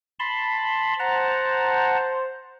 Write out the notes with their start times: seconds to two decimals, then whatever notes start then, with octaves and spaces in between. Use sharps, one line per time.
0.19 A5 B5 C6
0.99 C5 F#5 A5 A#5